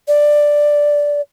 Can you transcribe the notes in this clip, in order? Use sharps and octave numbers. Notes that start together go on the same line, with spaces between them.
D5